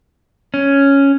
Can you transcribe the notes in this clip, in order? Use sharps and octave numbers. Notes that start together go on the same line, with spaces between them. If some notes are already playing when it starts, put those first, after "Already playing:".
C#4